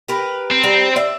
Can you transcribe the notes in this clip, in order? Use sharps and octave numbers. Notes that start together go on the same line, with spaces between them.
G4 A#4 B4
C4
G3 A#5
D5 E5